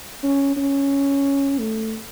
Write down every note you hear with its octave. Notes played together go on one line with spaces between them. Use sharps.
C#4
C#4
A3